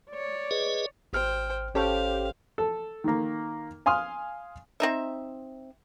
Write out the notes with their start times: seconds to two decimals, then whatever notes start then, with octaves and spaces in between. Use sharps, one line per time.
0.10 C#5 D5
0.51 G#4 B4 D#5
1.13 G#1 C5 G5 F6
1.75 G#1 C#4 G4 A4 C5 F5
2.58 A4
3.04 D#3 A#3
3.86 F5 G#5 C6 D#6 F6
4.80 C4 D#4 E5